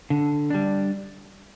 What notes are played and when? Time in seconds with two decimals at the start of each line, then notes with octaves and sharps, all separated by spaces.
0.10 D3
0.50 G3 D4